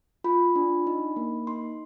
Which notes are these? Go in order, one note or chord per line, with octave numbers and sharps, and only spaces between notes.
F4 B5
D4
D#4
A#3
D#4 C6